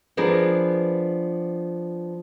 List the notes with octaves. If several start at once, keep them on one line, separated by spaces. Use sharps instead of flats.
F3 B3 D4 G#4 A#4 B4